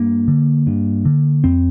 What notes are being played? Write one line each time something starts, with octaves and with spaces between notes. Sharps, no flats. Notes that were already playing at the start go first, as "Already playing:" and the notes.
Already playing: G2 A#3
D3
G2
D3
F2 C4